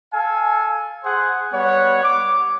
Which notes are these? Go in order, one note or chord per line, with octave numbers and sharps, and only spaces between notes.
A4 F5 G#5
G#4 C5 F#5
G3 B3 C#5 F#5
D6